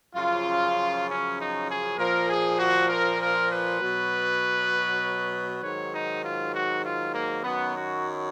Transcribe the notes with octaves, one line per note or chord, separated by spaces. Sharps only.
F#2 C#3 F3 F4
C#4
D#4
G#4
A#2 F3 A#4
G#4
F#4
A#4
A#4
B4
B2 F#3
G#2 D#3 F#3 C#5
D#4
F4
F#4
F4
A#3
F#2 D#3 F#3 B3
F#4